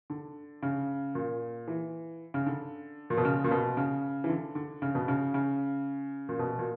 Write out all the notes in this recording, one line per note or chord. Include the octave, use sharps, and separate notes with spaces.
D3
C#3
A#2
E3
C#3
D3
A#2
B2
C#3
A#2
B2
C#3
E3
D3
D3
C#3
B2
C#3
C#3
A#2
B2
A#2